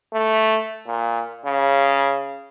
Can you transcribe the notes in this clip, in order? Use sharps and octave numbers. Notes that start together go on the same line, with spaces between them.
A3
A#2
C#3